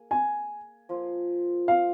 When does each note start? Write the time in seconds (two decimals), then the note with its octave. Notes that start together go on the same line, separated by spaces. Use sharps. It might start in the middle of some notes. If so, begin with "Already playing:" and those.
Already playing: A#3 G#4
0.11 G#5
0.89 F3 A#3 F4
1.68 F5